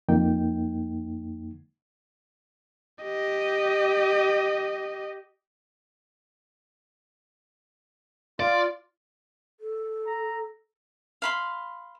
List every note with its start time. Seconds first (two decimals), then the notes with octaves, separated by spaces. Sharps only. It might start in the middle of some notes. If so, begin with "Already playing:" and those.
0.09 F2 A#3 D#4 G5
3.03 G4 D#5
8.40 F4 D5
9.60 A4
10.06 A#5
11.22 F5 B5 C6